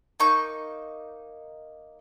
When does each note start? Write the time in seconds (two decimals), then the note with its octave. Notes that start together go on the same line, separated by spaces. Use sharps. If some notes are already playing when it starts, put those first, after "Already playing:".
0.20 A#3 D#4 C#6 G6